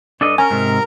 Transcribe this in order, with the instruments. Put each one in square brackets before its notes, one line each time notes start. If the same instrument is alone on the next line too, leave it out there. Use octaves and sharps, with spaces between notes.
[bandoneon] G2 [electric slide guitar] D4 A4 D#5
[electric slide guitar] C#4 [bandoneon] A#4 A#5 [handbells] G#5
[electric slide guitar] G#2 C3